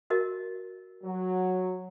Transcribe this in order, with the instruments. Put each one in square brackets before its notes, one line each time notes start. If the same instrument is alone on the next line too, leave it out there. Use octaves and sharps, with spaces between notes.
[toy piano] F#4 A#4 D#5
[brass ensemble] F#3